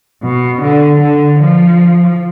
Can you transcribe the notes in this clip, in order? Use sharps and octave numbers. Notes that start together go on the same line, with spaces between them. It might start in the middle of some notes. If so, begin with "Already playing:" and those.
B2
D3
D3
F3